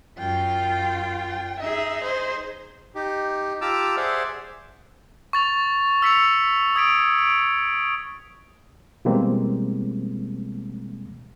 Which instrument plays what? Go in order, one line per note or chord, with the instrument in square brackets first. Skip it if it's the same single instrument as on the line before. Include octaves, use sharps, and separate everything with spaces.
[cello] F#2 F4 [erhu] G5
[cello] D#4 G#4 [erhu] E5
[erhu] C5
[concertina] D#4 G4
F4 G4 A5 A#5 D6 E6
G#4 C5 D5 E5 F#5
[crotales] C#6 A6 F7
E6 B6 C#7 F7
D#6 G#6 B6 D7 F7
D7
[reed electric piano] B2 E3 G3 G#3 A#3 C4